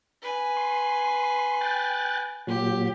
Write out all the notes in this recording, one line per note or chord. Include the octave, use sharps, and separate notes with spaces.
B4 G#5
C6
G5 F#6 A6
A#2 F#3 G4